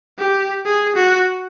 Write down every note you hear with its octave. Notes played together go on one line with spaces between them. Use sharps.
G4
G#4
F#4